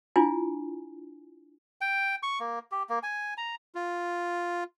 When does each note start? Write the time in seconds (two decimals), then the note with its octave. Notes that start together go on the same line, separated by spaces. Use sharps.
0.16 D4 E4 F4 G#5
1.81 G5
2.23 C#6
2.40 A#3
2.72 G4
2.89 A#3
3.03 G#5
3.38 A#5
3.75 F4